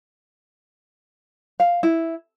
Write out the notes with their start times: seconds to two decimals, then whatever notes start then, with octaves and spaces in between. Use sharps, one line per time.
1.60 F5
1.83 E4